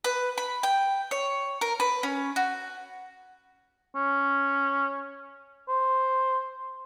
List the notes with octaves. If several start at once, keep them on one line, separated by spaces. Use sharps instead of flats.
B4
B5
G5
C#5
A#4
B4
C#4
F#4
C#4
C5